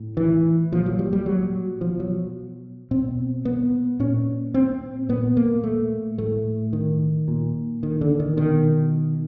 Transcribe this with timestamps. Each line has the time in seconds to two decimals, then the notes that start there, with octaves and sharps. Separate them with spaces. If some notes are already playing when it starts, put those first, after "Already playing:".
Already playing: A2
0.17 E3
0.72 A#2 F3
0.86 F#3
0.99 G3
1.13 G3
1.26 F#3
1.80 B2 F3
2.00 F#3
2.91 B2 C4
3.45 B3
3.99 A#2 C#4
4.54 C4
5.09 A#2 B3
5.37 A#3
5.64 A3
6.18 A2 A3
6.73 D#3
7.28 A#2
7.83 D#3
8.01 D3
8.20 D#3
8.37 B2 D#3